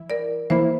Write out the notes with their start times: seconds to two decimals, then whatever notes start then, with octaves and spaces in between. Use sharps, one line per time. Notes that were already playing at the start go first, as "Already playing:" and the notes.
Already playing: E3 E4
0.10 A#4 D5
0.50 E3 A#3 E4 C5 E5